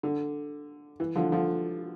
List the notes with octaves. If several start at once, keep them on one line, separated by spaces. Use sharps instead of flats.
D3
E3
D3 F3
D3 F3